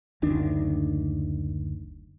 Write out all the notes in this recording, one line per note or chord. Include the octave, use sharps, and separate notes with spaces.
F#1 D2 D#3 D4